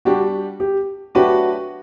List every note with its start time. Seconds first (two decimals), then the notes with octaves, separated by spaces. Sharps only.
0.05 G3 D4 F#4 G4
0.60 G4
1.15 F#3 A3 D4 F#4 G4 B4